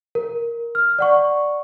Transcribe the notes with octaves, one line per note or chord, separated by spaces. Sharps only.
A#4
F6
D5 F#5 C#6